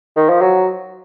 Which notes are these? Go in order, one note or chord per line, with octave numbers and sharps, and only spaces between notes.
D#3
F3
F#3